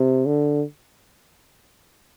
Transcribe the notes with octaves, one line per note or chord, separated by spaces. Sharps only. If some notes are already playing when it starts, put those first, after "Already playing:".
Already playing: C3
D3